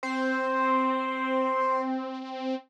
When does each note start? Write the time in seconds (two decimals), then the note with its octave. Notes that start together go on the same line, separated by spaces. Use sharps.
0.03 C4 C5